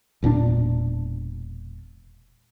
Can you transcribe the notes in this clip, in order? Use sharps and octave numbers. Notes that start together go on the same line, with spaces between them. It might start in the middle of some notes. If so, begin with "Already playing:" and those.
E1 A#2 C4 D4